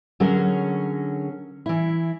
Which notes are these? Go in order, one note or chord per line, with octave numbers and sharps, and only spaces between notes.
D3 F#3 C#4 G#4 A#4
E3 E4